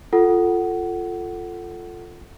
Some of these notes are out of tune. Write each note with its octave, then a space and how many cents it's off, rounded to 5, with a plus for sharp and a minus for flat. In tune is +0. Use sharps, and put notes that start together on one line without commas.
F4 +0 A4 +0 F#5 +15